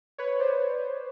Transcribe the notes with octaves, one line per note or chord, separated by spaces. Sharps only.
B4 C#5
C5 D5